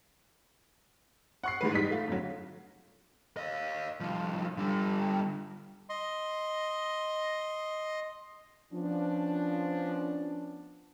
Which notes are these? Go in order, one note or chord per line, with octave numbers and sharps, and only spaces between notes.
F#5 C#6 C7
G#2 E3 B4
G3 D#4 B6
A3 F4
F2 D3 F#3
D#5 F5
C2 F3
D3 G3
D#5 C6
F3 B3 C#4 D4